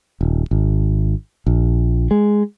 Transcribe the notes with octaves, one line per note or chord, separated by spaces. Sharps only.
D#1
G#1
A#1
G#3